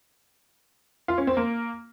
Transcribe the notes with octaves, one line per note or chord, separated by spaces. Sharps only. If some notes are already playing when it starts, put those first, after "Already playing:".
F4
C#4
C4
A#3